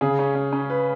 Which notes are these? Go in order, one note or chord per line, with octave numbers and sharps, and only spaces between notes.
C#3 G#4
C#4
C#4
C#4
B4